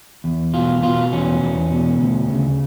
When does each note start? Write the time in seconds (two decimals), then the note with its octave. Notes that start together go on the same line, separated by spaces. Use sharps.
0.24 E2
0.54 B2 F4
0.83 B2 F4
1.12 E2 C#4
1.42 E2
1.71 B2
2.01 D2
2.30 C#3